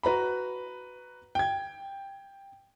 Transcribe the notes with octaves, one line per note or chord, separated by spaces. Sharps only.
F#4 B4 A#5 B5
G5 G#6